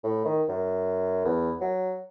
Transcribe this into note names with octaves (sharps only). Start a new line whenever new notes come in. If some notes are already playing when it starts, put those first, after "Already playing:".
A2
D#3
F#2
E2
F#3